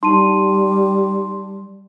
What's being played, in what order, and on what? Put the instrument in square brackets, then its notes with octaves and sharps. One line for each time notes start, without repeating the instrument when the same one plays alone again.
[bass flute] G3 [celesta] D#4 A5 D#7 [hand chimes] C6